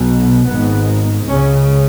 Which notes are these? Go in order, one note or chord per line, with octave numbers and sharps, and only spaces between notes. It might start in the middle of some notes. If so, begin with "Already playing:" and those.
Already playing: B1 B2
G#1 G#2 B3
C#2 C#3 C#4